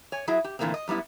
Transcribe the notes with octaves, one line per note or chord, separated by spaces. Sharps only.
C#5 G#5
F#3 E4 G#4 E5
G4
A#2 D3 E3 A3 A#3 C4
D#5
F#2 G3 B3 E4